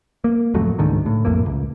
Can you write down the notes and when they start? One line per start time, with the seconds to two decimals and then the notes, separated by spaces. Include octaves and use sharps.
0.24 A#3
0.54 D1 F2 F#3 A3
0.78 C#2 G#2 D3 D#3
1.06 A2
1.25 B1 F2 A2 A#3
1.46 C#2